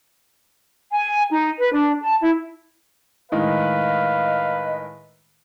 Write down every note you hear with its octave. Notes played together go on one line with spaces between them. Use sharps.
G#5
D#4
B4
D4
A5
E4
A2 D#3 G#3 B4 D#5 F5